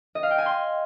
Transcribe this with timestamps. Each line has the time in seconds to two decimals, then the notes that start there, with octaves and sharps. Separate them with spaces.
0.15 D#5
0.23 F5
0.31 G5
0.38 G#5
0.46 C6